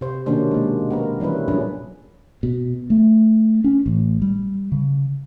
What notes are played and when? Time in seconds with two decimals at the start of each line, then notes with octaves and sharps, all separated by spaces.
0.01 C3 C5
0.26 B2 D#3 A#3 C#4 D4 C5
0.51 G#3 A#3
0.90 B3 C4 A#4
1.20 E3 G3 C#4 E4 B4
1.48 A#2 F#3 G3 C#4 D4 G#4
2.43 B2
2.90 A3
3.64 C#4
3.86 A1
4.22 G3
4.72 C#3